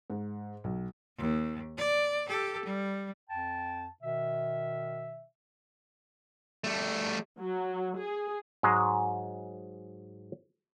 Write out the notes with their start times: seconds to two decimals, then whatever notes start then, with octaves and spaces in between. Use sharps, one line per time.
0.10 G#2
0.64 B1
1.18 D#2
1.77 D5
2.27 G4 A4
2.65 G3
3.30 F2 G5 A5
4.03 B2 D#3 E5
6.64 G3 A3
7.40 F#3
7.98 G#4
8.63 G#2 F#3 G#3